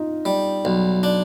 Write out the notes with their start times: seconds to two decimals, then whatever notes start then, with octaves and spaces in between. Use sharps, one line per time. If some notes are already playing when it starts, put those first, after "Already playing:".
Already playing: D#4 F4
0.25 G3
0.65 B1
1.03 D4